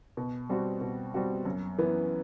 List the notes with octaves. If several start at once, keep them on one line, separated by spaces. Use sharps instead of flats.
B2
G3 C4 F#4
B2
G3 C4 F#4
F#2
E3 B3